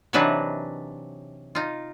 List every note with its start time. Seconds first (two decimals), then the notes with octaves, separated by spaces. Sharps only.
0.13 C3 E3 F#3 D4 D#4 B4
1.55 D#4 F4